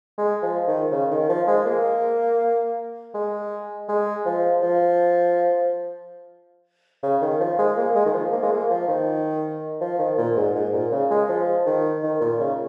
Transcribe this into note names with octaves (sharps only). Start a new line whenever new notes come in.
G#3
F3
D#3
C#3
D#3
F3
G#3
A#3
G#3
G#3
F3
F3
C#3
D#3
F3
G#3
A#3
G#3
D#3
F3
A#3
G#3
A#3
F3
D#3
F3
D#3
A#2
G#2
G#2
A#2
C#3
G#3
F3
D#3
D#3
A#2
C#3